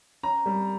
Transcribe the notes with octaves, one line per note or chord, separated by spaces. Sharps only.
C#4 A#5
G3